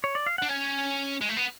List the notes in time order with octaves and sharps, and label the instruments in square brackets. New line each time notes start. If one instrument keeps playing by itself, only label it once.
[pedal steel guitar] C#5
D5
F5
[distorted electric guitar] D4 [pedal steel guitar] F#5
[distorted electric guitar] C#4 [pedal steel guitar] G#5
[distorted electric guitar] G#3
A3
B3